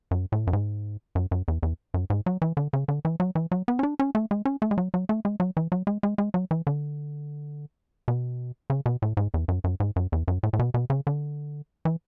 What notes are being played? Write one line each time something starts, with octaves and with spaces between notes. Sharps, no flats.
F#2
A2
F#2
G#2
F#2
F#2
E2
E2
F#2
G#2
F#3
E3
D3
C#3
D3
E3
F#3
E3
F#3
B3
C#4
D4
C#4
A3
G#3
C#4
A3
G#3
F#3
F#3
A3
G#3
F#3
E3
F#3
G#3
G#3
G#3
F#3
E3
D3
B2
C#3
B2
A2
G#2
E2
F#2
F#2
G#2
F#2
E2
F#2
A2
A2
B2
B2
C#3
D3
E3